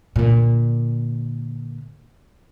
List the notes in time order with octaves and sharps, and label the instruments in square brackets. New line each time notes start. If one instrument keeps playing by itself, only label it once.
[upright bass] A#2 D3